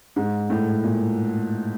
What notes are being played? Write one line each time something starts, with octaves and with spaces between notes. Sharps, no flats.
G#2
A2
A#2